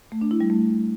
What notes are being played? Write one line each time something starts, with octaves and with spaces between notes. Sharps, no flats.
A3
D4
E4
G3
A3